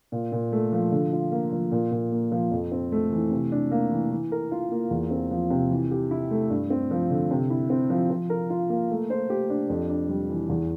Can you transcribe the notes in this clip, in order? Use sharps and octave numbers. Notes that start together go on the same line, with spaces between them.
A#2
A#2
A3
F3
D3
F4
A#3
F3
A#2
A#2
A#3
F3
F2
C4
A3
E3
C3
D4
A#3
E3
E3
A#4
F4
A#3
E2
C4
F3
C3
E3
G4
E4
A3
G2
C4
F3
D3
C3
E4
C4
F3
F3
A#4
F4
A#3
A3
C5
G4
D4
F2
D4
G3
E3
E2